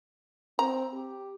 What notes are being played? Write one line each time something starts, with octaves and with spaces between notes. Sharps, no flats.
C4 A#5
G4